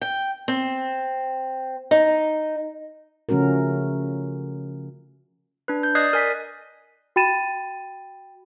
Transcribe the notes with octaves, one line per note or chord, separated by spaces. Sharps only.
G5
C4
D#4
C#3 F3 A3 C#4 F#4 A#4
D4 B4
G6
D5 D#5 D#6 F#6 G#6 C7
A#4 G#5 B6
F#4 G5 B5 A6 D#7 E7